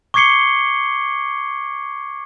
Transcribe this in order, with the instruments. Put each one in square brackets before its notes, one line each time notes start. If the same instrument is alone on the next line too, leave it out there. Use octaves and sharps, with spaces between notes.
[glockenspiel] C#6 D6 G#6 C7 C#7 G7